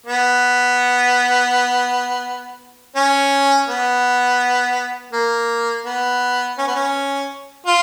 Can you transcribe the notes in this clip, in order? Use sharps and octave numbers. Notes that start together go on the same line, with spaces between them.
B3
C#4
B3
A#3
B3
C#4
B3
C#4
F4